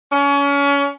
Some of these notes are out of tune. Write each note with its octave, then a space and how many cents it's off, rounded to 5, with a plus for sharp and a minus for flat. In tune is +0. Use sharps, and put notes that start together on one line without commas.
C#4 +30